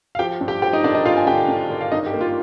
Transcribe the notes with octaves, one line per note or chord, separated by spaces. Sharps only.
F5
F3 G4 G5
G2
G4 G5
F3 G4 G5
D#4 D#5
G#1 D4 D5
D#4 D#5
G#1 F4 F5
G#5
D3 G4 G5
D3
G#1
F5
G2 D#4 D#5
G4
A#3
F4